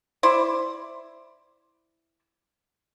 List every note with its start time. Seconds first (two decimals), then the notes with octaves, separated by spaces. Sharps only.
0.23 E4 C5 D5